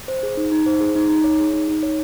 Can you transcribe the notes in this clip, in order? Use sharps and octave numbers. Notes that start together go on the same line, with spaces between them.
C5
G#4
D#4
D#4
C5
G#4
D#4
D#4
C#5
G#4
D#4
D#4
C#5